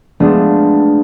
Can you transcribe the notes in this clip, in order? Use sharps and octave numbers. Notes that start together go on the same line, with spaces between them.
G#3 A3 B3 D4 F4